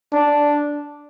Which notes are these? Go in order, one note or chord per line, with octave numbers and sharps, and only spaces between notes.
D4